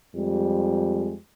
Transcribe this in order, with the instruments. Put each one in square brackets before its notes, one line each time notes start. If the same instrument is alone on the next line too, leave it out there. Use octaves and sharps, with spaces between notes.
[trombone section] F2 G3 G#3